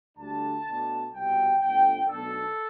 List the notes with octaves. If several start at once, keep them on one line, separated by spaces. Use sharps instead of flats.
D2 D3 G3 D4 A5
B2 A3 D4
C2 B2 G3 C4 G5
G1 F2 D3 A3 G5
B1 B2 A3 D4 A4